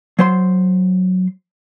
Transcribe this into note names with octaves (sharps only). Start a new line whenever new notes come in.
F#3 C5 C6